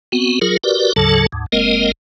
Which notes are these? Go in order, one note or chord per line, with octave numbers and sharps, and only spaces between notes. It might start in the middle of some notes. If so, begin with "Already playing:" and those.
B3 C4 F#4
F#3 F4 G#4 A#4
F#4 G4 A#4 B4 D5
D2 G#2 C#3 F#3 A4 A5
D2 G#2
F#1 G#3 A#3 C4 A#4 D#5